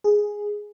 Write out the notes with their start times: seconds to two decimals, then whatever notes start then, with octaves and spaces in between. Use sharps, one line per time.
0.04 G#4